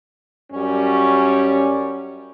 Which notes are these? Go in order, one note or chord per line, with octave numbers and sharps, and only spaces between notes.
F#2 G3 C#4